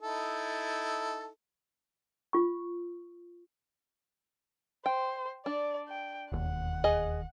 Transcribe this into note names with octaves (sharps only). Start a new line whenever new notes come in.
D#4 E4 A4
F4 C#6
C5 G5
D4 D5
G5
E1 D#2 F#5
G#4 D#5